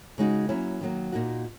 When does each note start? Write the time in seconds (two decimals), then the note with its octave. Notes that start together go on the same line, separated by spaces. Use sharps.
0.18 C#3 G#3 D#4 F#4
0.49 F#3 A#3 C#4 E4
0.81 D#3 F#3 A#3
1.12 A#2 A#3 D#4 F#4